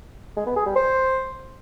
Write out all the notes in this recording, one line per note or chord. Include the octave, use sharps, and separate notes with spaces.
G#3
B3
G#4
G3
C5